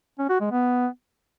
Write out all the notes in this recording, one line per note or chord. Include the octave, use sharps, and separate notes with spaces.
C#4
F#4
G#3
B3